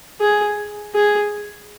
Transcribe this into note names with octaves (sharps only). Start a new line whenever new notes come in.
G#4
G#4